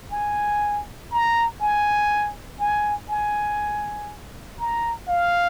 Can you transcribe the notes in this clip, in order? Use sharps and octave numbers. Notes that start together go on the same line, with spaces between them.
G#5
A#5
G#5
G#5
G#5
A#5
F5